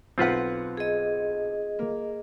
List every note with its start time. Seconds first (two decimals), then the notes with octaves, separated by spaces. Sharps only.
0.18 B1 C4 F4 B4 F#5
0.77 G#4 D#5
1.79 A#3